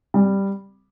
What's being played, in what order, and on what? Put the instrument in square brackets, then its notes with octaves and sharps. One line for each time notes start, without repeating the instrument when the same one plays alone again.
[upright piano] G3